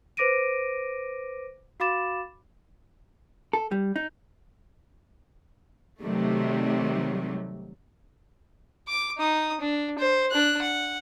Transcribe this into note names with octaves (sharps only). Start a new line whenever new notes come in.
B4 C5 D6 A#6 D7 D#7
F#4 F5 B5 D6 A6 E7
A4
G3
D#4
C3 D#3 F#3 G3 A3
D6
D#4 D#6
D4
C5
D4 F#6
F#5